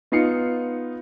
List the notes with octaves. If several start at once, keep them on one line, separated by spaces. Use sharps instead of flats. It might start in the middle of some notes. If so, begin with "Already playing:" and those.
B3 D#4 F4 C7 C#7